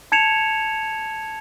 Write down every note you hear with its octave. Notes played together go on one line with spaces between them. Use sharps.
A5 G#6 C#7 E7 F7